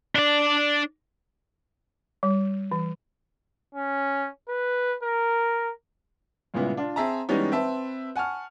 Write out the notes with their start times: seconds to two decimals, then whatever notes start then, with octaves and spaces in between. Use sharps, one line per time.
0.15 D4 D5
2.23 G3
2.72 E3
3.75 C#4
4.48 B4
5.03 A#4
6.54 G2 A#2 C#3 G#3 B3 E4
6.77 D4 F4
6.96 C4 G#4 E5 A5 A#5
7.29 E3 G3 G#3 B3 C#4 D#4
7.52 C4 B4 E5 A5
8.16 F#5 G#5 A5 C#6 F6